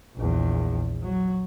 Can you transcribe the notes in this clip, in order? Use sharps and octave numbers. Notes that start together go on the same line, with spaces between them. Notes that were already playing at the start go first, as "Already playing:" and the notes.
A#1 E2
F#3